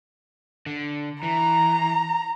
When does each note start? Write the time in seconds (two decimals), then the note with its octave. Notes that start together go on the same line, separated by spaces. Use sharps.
0.66 D3
1.23 E3 A#5